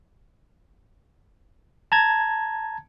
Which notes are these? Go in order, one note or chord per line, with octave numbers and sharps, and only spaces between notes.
A5 A#5 G#6